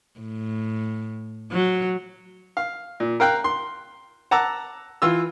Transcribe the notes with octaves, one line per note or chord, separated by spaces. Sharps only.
A2
F#3
F5
A#2
A#4 F5 G5 F#6
C6
F#5 A5 A#5 D6 E6
E3 F4 E6